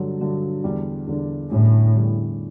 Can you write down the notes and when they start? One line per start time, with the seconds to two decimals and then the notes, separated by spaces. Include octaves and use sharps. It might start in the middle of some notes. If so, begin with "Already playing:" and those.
Already playing: G2 D3 F#3
0.20 G2 D3 F#3
0.64 E2 D3 G3 D4
1.07 E2 D3 G3 D4
1.52 E2 A2 D3 G3 C#4 E4
1.95 E2 D3 G3 C#4 E4